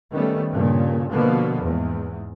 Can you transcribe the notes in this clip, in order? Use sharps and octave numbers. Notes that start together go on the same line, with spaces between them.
D#3 G3 A3 B3 C#4
G2 A#2 C#3
B2 D3 F3 A#3 B3
E2 G#2